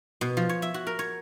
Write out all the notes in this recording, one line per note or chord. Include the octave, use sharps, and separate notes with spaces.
B2
F3
C#5
E5
F#4
A#4
C#5